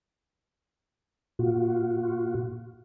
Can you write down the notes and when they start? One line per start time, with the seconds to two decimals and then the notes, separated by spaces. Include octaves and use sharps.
1.39 A#2 F4 F#4